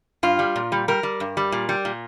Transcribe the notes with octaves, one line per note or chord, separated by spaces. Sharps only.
G2 F4
G3
A#2
G3
G3 A#4
G3
G2
G3
A#2
G3
A#2